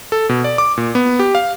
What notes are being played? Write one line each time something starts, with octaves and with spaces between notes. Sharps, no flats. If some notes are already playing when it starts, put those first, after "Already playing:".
A4
B2
D5
D6
A#2
B3
G4
F5